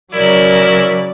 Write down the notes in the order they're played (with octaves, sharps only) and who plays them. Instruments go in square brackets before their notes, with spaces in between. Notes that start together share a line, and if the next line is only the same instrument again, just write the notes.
[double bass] C#3 F#3 [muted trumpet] E4 [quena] A#4 [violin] D5